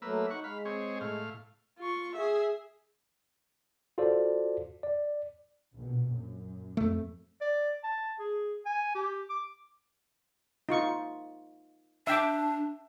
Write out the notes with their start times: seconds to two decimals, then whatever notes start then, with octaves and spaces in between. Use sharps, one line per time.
0.02 F#3 A3 A#3 B4 E6
0.30 D#4 F#5 C#6
0.44 G#3 F5 B5
0.65 C4 G#4 C#5
1.01 A2 F5
1.79 F4 C#6
2.16 G#4 E5
3.98 F4 F#4 A4 C5 D5
4.83 D5
5.74 A#1 B2
6.10 F#2
6.77 F2 A3
7.41 D5
7.84 A5
8.19 G#4
8.66 G#5
8.95 G4
9.30 D6
10.69 D#4 F4 C#6
12.07 D4 E5 G5 D6